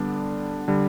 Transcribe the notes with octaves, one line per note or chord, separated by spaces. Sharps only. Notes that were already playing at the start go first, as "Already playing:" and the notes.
Already playing: D3 G3 B3 D4
D3 G3